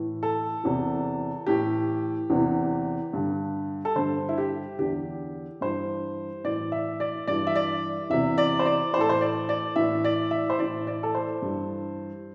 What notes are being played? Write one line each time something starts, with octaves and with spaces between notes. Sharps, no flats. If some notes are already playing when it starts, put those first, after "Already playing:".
Already playing: A2 E3
A4
E2 C3 E3
A2 E3 G4
E2 C3 E3
G2 D3
A4
G2 D3 C5
E4
G4
E2 D3 G4
G2 E3 C5
A2 E3 D5
E5
D5
G2 E3 D5
E5
D5
E2 C3 E3 E5
D5
C5
D5
A2 E3 A4 C5
C5
D5
D5
A2 E3 E5
D5
E5
C5
A2 E3 D5
D5
A4
C5
G2 E3